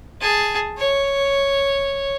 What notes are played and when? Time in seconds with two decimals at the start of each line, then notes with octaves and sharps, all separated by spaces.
0.21 G#4 A5
0.78 C#5